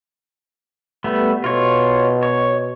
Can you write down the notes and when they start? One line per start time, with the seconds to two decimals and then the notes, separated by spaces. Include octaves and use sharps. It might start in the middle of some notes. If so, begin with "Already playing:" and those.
1.04 G3 A3 B3
1.44 B2 F4 C#5
2.23 C#5